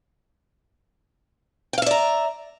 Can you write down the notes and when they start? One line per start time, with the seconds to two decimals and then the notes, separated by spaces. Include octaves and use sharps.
1.73 G5
1.78 F5
1.82 E5
1.86 D5
1.91 A#5